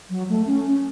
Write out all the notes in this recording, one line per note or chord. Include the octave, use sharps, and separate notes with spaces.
F#3
A3
C#4
C#4